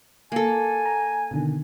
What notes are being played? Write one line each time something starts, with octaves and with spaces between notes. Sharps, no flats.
A#3 A4 G#5
A#5
B2 D3 D#3